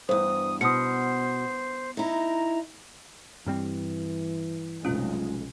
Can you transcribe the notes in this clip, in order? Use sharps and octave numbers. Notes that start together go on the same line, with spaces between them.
E2 G2 C5 D#6
B2 C5 D#6 C#7
D#4 E4 A#5
G2 E3 G3 C4
F1 B1 G#3 C#4 F4